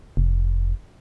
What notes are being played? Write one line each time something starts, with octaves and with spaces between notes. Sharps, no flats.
F1